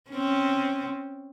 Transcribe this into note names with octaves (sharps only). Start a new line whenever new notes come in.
C4 C#4